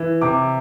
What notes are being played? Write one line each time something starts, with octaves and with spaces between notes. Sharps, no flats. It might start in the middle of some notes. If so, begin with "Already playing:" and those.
Already playing: E3
C3 D6